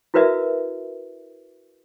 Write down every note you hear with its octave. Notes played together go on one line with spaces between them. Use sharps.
E4 F#4 A#4 B4 D#5 E5